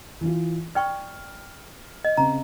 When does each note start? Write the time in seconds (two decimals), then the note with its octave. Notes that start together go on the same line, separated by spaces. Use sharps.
0.21 E3 F4
0.75 D5 G5 C#6 F6
2.05 D#5
2.17 C#3 C4 A#5